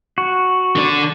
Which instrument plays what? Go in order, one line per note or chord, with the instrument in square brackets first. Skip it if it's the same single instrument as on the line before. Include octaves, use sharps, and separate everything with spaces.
[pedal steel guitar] F#4
[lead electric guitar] D3 D5